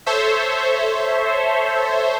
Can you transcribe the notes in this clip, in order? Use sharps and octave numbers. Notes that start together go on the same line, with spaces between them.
A4 C5 C#5 E5